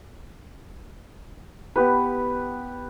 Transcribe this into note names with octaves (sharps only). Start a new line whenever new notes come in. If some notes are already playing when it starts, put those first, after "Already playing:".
B3 G4 B4